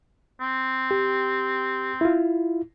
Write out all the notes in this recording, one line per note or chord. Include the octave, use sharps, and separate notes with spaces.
C4
G4
E4 F4